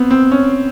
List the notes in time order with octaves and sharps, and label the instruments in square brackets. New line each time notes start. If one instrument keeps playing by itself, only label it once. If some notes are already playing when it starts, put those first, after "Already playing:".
Already playing: [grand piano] B3 C4
C4
C#4